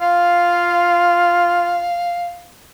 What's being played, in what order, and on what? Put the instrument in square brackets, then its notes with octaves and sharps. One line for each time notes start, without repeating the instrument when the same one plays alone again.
[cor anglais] F4 [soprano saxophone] F5